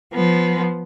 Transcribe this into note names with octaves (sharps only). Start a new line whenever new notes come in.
F3 B3